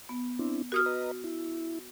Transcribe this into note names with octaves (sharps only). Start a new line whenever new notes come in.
B3
C4 D4 E4
F#4 G4 A#4 D#6 F6
B4 D#5 A#5
E4